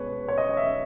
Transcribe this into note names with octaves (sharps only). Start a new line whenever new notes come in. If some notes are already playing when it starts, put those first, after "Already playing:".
Already playing: B2 G#3 C#4 B4 C#5
C#5
D#5
E5